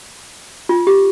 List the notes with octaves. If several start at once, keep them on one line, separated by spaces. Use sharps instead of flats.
F4
G4